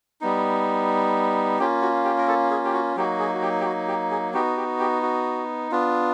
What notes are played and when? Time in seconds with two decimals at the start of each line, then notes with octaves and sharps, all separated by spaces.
0.21 G3 B3 D#4
1.59 A#3 C#4 F4 G4
1.82 F#4
2.05 G4
2.18 A#4
2.28 A4
2.51 G#4
2.65 G4
2.74 F#4
2.96 F#3 A#3 D#4 F#4 G4
3.19 G#4
3.34 F#4
3.42 G4
3.60 G4
3.66 F#4
3.88 G4
4.11 G#4
4.34 B3 D#4 F#4 G4
4.57 G4
4.80 G4
5.02 F#4
5.71 B3 D4 F4